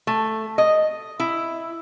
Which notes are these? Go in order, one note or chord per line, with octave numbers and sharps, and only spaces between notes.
A3
D#5
E4